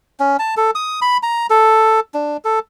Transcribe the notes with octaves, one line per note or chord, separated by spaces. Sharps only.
C#4
A5
A4
D#6
B5
A#5
A4
D4
A4